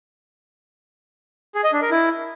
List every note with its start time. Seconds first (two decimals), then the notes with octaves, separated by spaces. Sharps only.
1.55 G#4
1.64 D#5
1.73 D4
1.82 A#4
1.91 E4